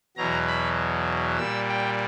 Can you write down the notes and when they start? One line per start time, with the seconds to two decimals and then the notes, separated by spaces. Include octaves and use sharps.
0.17 E2 B2 F#3 A#5
0.47 B5
1.38 A#2 G3 E6
1.69 G5